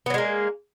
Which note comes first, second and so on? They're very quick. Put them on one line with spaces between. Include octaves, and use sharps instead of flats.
B3 F#3 G#3 A#3